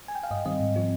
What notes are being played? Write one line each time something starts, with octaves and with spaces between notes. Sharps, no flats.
G#5
G5
F5
G2 D#5
D#3 G3 C4 D#5
G#2
F3 C4 F4